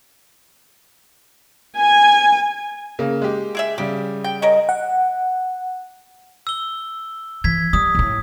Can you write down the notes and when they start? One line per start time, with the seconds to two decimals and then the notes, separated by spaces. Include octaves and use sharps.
1.77 G#5
2.99 C#3 A#3
3.22 G#3 G4
3.55 E4 G#4 E5
3.78 C#3 G3 G4
4.24 G5
4.42 C#4 A#4 D#5
4.69 F#5
6.47 E6 G7
7.44 E3 G#6 B6
7.73 G3 D#6
7.95 A1 A2